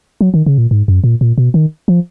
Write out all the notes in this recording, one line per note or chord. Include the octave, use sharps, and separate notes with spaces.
F#3
D#3
C#3
A#2
G#2
F#2
A#2
A#2
B2
D#3
F3